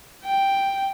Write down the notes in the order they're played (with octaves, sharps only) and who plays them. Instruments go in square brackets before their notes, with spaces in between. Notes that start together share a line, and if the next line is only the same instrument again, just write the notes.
[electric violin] G5